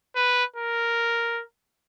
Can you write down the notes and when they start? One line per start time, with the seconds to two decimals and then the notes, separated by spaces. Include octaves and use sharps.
0.15 B4
0.56 A#4